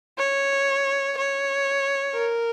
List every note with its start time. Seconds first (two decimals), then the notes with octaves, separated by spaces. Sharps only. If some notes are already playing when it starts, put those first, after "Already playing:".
0.18 C#5
1.17 C#5
2.15 A#4